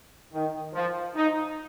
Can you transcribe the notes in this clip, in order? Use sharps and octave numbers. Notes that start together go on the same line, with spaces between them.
D#3
F3
D#4